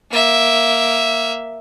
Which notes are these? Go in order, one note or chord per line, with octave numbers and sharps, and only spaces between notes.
A#3 E5